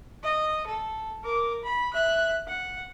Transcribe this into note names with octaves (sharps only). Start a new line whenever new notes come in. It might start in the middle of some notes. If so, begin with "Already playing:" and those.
D#5
A4
A#4 D6
B5
E5 F#6
F#5